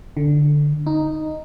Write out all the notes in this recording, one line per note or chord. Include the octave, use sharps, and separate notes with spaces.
D3
D#4